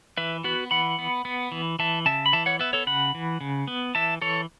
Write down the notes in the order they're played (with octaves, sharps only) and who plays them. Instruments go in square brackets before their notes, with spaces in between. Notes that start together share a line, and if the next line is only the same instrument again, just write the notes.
[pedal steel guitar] E3 B4 E5
B3 F#4 B4
E3 F#5 B5
B3
B3
E3
E3 E5 A5
C#3 E5 A5
B5
E3 E5 A5
C#5 F#5
B3 B4 E5
A4 C#5
C#3 F#5 B5
E3
C#3
B3
E3 E5 A5
E3 A4 C#5